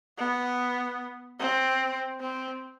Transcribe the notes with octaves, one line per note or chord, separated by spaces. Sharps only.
B3
C4
C4